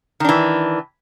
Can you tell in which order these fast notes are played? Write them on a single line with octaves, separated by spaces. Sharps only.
D#3 D4 E3